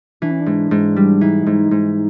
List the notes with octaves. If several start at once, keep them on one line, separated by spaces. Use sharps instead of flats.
E3 D4
C#4
D4
G#2
G#2
G3
E3 D#4
G#2
G#2